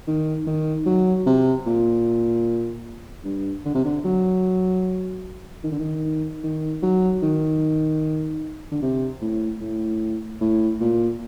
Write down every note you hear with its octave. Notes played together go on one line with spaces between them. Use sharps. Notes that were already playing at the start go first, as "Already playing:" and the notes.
D#3
D#3
F#3
C3
A#2
G2
D3
C3
D3
F#3
D#3
D3
D#3
D#3
F#3
D#3
D3
C3
A2
A2
A2
A#2